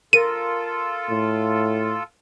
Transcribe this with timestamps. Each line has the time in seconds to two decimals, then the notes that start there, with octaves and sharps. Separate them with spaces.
0.13 F4 A4 A#4 D#7
1.10 A2